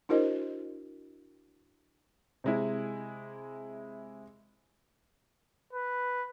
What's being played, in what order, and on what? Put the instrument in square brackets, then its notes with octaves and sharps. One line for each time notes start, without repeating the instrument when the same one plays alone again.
[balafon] D4 E4 F#4 A#4 C5 D#5
[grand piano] C3 G#3 E4
[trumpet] B4